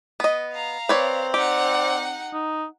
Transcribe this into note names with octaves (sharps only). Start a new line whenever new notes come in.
B3 D#5
F5 A#5
C4 B4 C#5 D5
D#4 G4 D5 F#5
D#4